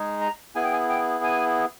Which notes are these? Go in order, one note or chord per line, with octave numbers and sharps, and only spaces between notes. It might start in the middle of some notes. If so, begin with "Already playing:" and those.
Already playing: G#3 D#4 G#4
A#5
B3 E4 G#4 G#5
G5
G#5
G5
G#5